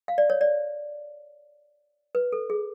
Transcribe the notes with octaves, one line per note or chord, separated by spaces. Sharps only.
F5
D5
C#5
D5
B4
A4
G#4